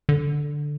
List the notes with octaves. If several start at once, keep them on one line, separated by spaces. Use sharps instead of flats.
D3